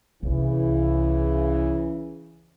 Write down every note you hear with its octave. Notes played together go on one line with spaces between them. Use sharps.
C2 C#3 E3